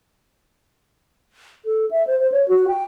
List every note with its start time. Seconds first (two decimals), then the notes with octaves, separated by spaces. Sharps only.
1.65 A4
1.91 E5
2.07 C5
2.20 C5
2.32 C#5
2.48 F#4
2.68 G5